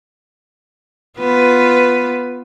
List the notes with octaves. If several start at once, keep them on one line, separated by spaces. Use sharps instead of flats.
B3 F4 B4